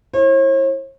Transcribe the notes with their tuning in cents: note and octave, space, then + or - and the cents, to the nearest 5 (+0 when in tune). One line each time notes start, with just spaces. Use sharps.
E4 +0 C#5 -45